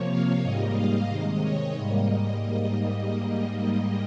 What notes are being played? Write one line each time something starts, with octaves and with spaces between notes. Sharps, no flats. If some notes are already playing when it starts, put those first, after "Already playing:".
Already playing: C3 F3 A#3 C#5
F5
G#2 G3 A#3 D#5
F5
C3 D#3 G#3 D#5
C#5
G#2 G3 A#3 D#5